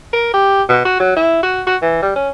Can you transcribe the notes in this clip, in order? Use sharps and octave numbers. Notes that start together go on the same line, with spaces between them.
A#4
G4
B2
F#4
F#3
E4
F#4
F#4
E3
G3
C#4